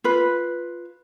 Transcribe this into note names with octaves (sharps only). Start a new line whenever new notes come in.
F4 B4